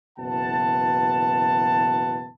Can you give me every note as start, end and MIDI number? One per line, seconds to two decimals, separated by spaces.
0.18 2.28 30
0.18 2.28 47
0.18 2.28 52
0.18 2.28 78
0.18 2.28 81